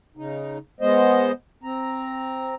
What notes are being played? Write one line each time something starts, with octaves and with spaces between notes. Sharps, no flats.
C#3 D#4
G#3 B3 C5 D#5
C4 A#5